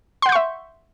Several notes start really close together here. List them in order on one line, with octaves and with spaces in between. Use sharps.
C6 F#5 G6 C#6 E5